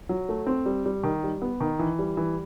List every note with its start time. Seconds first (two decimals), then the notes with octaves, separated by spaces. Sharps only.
0.09 F#3
0.29 A3
0.47 C4
0.66 G3
0.86 G3
1.03 D#3
1.24 G3
1.42 B3
1.60 D#3
1.79 E3
1.99 G3
2.17 E3